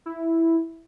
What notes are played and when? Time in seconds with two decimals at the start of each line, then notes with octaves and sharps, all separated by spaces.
0.06 E4